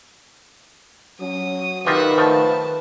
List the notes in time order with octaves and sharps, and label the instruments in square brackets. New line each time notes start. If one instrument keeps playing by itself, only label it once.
[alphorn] F#3 [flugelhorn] C#4 [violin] D#6
[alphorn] D#3 [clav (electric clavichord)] F4 G4 D#5 [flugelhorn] B4 [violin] E5 F#5
[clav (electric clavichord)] F3 A3 [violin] A5